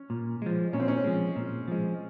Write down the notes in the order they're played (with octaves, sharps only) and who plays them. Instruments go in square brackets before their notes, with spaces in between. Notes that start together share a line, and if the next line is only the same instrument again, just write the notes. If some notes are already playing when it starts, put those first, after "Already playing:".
Already playing: [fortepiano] C#4
[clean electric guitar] A#2
F3 G#3
[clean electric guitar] A#2 [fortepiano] C#4
[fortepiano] C4
C#4
[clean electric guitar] F3 G#3
A#2
F3 G#3